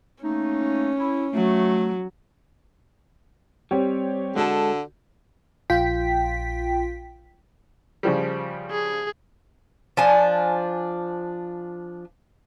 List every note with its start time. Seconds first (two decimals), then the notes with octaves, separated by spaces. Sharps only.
0.23 A3 A#3 C#4 D#4
0.99 E4
1.34 F#3 A3
3.71 G3 C4 G4 C#5
4.36 D3 G#3 F#4 A4
5.70 A#1 F4 G5 B6
8.03 C#3 F3 G3
8.71 G#4
9.97 F3 D4 G#5